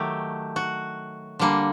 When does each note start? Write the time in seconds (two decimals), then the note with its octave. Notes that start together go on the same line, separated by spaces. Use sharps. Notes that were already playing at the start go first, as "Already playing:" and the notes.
Already playing: D#3 F#3 A3 G4
0.56 F#4
1.39 D3 G3 A#3